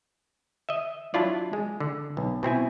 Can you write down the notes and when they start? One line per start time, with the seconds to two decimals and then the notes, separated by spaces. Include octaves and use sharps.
0.69 D#5 E5
1.14 F#3 D4 E4 F4 D5
1.53 G#3
1.80 D3
2.17 B1
2.43 B2 C4 E4 G#5